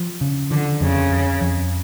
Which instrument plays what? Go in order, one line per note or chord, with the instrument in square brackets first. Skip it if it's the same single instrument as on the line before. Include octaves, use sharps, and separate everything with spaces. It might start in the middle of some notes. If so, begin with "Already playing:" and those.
Already playing: [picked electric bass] F3
C#3
[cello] D3 [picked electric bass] F3
[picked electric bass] F2 [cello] C#3
[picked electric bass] F2
F2